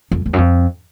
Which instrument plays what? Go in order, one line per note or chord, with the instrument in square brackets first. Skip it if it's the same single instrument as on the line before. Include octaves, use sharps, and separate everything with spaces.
[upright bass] F2
E2
F#2
F2